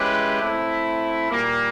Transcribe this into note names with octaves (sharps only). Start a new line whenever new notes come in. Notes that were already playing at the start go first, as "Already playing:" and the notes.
Already playing: G#3 C#4 E4 G4 B4
A3 C4 E4
A#2 G3 A#3